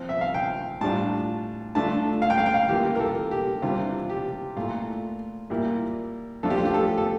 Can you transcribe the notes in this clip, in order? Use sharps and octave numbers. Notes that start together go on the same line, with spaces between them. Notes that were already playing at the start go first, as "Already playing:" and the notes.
Already playing: F3 C4 F4
E5
F5
G5
A2 G3 D4 F4 A5
D3 A3 D4 F4 A5
F5
G5
F5
G5
F5
E3 A#3 F4 G4
A#4
A4
G4
C3 E3 G3 D4 F4
G4
A#2 A3 E4 F4
A#2 G3 A#3 E4
F3 A3 D4 F4 A4
G4
F4
G4
A4
A4